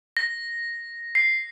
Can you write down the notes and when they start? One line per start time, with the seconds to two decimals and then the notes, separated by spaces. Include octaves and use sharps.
0.17 A#6
1.15 C7